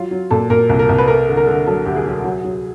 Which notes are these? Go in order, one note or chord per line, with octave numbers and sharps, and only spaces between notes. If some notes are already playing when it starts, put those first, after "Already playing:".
Already playing: F#3 F4
F#3
A#2 A4
A#2 A#4
C2
A#4
C2
B4
A3 A#4
D3
A#4
D3
F#3 A4
D2 G4
G#4
F#3
F#3
F#3